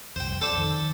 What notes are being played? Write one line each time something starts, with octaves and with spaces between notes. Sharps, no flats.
C2 F2 C5 G5
F2 A4 C5 D5
D#3